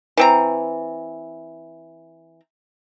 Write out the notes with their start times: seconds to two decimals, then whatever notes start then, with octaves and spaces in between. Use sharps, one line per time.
0.17 E3 C4 A#5